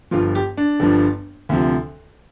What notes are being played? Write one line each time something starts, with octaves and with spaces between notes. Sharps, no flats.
G1 G2 F3 F4
G4
D4
G1 G2 F3
D2 C3 F3